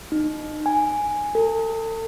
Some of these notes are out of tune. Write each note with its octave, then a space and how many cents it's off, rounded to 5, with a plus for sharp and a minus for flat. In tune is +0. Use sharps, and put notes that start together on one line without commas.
D#4 -25
G#5 +0
A4 +40